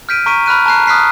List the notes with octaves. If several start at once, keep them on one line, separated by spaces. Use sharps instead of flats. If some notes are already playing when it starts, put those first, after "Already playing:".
F6 G6 B6 D7 D#7
A#5 C#6 B6 D7 D#7
B5 F6 F#6 D#7
A5 A#5 F#6 C7
D#6 F6 F#6 B6 C7